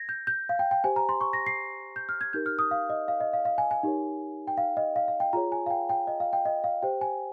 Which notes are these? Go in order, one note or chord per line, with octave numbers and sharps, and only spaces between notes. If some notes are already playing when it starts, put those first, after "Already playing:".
Already playing: G#6 A#6
G6
G6
F5
G5
G5
G4 C5 G#5
A#5
C6
C#6
A#6
C7
G6
F6
G#6
D#4 G4 A#4 G6
F6
D#6
F5
D#5
F5
D#5
F5
F5
G#5
G#5
D#4 G4 A#4 C#5
G5
F5
D#5
F5
F5
G5
F4 G#4 C#5 A#5
G#5
F5
G5
G5
D#5
F5
G5
D#5
F5
G4 C5 G5
G#5